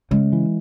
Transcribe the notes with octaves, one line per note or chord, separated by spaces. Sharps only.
C#3 G#3
E3